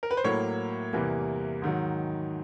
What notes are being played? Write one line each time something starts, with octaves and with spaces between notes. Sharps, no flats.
A#4
B4
C5
A2 F#3 A#3 C#5
E2 C3 E3 G3 A#3
G#2 D#3 F#3